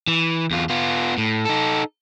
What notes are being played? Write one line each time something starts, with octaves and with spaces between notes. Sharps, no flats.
E3
E2 F4
B3 F4
A2
D#4 A4